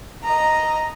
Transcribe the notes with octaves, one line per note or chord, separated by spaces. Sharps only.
D#5 A#5